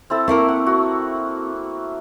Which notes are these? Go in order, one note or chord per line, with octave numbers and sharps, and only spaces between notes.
C4 E4 A4
A3 A#3 C4 E4 A#4
F#5
F#4